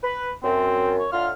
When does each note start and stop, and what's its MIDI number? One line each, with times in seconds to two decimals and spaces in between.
0.03 0.29 71
0.44 1.03 42
0.44 0.94 60
0.99 1.12 73
1.12 1.31 45
1.12 1.31 50
1.12 1.28 65
1.12 1.31 89